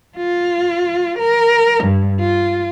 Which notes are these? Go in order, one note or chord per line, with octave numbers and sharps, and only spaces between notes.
F4
A#4
G2
F4